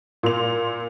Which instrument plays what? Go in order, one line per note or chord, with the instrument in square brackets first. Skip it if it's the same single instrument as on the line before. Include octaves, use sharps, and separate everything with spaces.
[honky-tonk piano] A#2 C6 F7